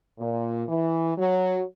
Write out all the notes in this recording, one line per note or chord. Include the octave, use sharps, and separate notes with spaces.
A#2
E3
F#3